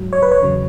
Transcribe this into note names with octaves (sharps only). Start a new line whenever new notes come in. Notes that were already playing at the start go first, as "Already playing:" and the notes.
Already playing: G#2 F#3
C#5
B4
C#5
E2 C#3 F#3